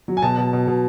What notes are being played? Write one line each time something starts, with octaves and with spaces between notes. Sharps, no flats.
F#3
G#5
B2 A5
B2
B2
B2